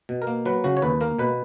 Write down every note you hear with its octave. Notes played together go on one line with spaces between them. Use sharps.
B2
A#4
A#3
F#3 B4
C#3 F#4
C#5
D#2 B4
A#3 A#4
B2 B4